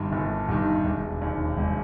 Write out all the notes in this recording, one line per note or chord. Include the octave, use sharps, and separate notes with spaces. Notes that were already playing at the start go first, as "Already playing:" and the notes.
Already playing: G1 G2 D#3
G1
G2 D#3
E1
D#2 D#3
E1